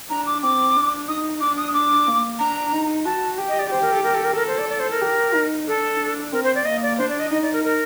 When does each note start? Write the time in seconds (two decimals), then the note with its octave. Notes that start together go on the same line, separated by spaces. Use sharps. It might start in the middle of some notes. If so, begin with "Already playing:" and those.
0.10 D4 A#5
0.27 D6
0.42 C4 D6
0.76 D4
1.08 D#4 D#6
1.41 D4 D6
1.57 D#6
1.74 D6
2.07 A#3
2.39 D4 A#5
2.72 D#4
3.05 F#4 A5
3.38 G4
3.48 D#5
3.59 D5
3.70 G4 C5
3.82 A#4
3.92 A4
4.03 A#4
4.14 A4
4.25 A#4
4.36 A4 A#4
4.47 C5
4.58 D5
4.69 D5
4.80 C5
4.91 A#4
5.01 G4
5.34 D#4
5.67 D4 A4
6.00 D4
6.32 C4 A#4
6.44 C5
6.55 D5
6.65 A#3 D#5
6.82 D5
6.98 D4 C5
7.09 D5
7.20 D#5
7.30 D#4 D#5
7.42 D5
7.53 A#4
7.64 A#4